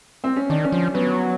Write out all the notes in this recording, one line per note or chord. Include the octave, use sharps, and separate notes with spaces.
C4
C#4
D#3 D4
C#4
F3
F#3 B3